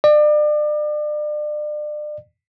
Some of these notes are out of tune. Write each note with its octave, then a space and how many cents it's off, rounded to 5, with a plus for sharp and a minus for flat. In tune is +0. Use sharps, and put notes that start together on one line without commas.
D5 +35